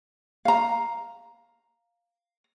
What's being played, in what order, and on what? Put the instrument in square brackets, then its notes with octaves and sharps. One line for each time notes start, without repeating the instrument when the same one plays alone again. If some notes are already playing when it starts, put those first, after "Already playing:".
[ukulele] F5 A#5